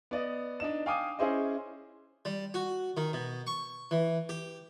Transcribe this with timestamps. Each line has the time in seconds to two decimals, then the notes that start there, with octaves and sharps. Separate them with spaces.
0.11 B3 D5 D#5
0.60 D4 D#4 E7
0.86 F5 G5 G#5 D6 D#6
1.19 C#4 E4 G#4 C5 D#5
2.25 G3
2.54 F#4
2.97 D#3
3.13 B2
3.47 C#6
3.91 E3
4.29 G4